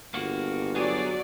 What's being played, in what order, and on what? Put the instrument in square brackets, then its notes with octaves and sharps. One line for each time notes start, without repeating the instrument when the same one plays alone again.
[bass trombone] G1 [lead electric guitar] A#3 F#4
[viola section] F#3 D5 [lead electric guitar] B3 G#4